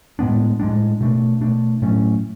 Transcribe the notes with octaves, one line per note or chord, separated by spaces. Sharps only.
A2 G#3 B3 D4
A2 G#3 B3 D4
B2 A3 D4
B2 A3 D4
A2 F#3 A3 C#4